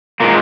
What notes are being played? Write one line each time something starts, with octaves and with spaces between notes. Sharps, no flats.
A#2 G#3 A#3